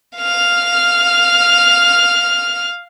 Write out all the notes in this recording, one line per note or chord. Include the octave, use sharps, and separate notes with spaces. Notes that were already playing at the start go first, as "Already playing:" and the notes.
F5 F6